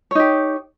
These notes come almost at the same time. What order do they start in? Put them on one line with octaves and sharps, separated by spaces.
C#5 D#4 G4